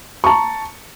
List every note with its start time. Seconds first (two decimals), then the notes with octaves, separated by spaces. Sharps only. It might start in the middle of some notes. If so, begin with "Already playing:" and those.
0.24 C#6
0.26 A5
0.29 A#5